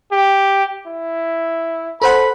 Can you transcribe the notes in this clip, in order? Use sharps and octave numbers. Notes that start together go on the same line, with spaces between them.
G4
E4
A4 C5 F#5 B5